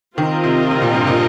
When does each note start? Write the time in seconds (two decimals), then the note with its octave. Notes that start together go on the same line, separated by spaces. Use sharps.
0.18 D#3 C4 F4 A#4 D#5
0.44 C3
0.71 C3
0.82 A#2
0.95 G2
1.07 A#2